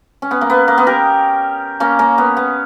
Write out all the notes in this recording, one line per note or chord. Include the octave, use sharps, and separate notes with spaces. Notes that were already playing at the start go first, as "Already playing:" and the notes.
C#4
B3
A#3
B3
A#3
B3
G4 A#4
A#3 C#4
A#3 C#4
B3
B3